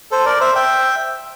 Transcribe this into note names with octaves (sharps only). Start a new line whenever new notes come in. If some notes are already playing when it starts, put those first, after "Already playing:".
A4 C5
A#4 D5
C5 E5
E5 G5